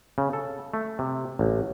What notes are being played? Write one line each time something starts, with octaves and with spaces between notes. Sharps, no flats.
C#3
A4
A3
C3
A1